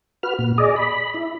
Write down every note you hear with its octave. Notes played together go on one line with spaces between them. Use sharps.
F#4 B4 F6
A#2
G#4 D5 D#5
B5
E4